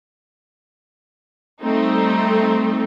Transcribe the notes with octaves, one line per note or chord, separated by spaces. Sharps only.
G3 A3 C4 D#4